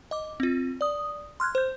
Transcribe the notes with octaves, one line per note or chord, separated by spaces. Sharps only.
D#5 D6
C4 F4
D5 D#6
C6 F6 F#6 G#6
C5 G6